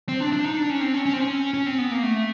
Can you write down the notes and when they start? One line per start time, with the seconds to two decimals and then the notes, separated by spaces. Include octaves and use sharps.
0.09 C4
0.20 D4
0.33 D4
0.45 D#4
0.57 D4
0.70 C#4
0.81 C4
0.94 C#4
1.06 C#4
1.13 C4
1.21 C#4
1.54 C#4
1.66 C4
1.78 B3
1.91 A#3
2.03 A3